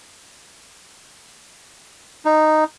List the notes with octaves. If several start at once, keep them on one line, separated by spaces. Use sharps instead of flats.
D#4